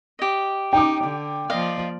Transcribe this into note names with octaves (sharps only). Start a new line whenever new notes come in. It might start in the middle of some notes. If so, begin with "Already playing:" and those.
G4 D#5
D#4 G5 D6
D3
F3 A#3 D5 D#5 F5